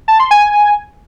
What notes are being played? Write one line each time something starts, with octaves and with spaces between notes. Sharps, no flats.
A5
C6
G#5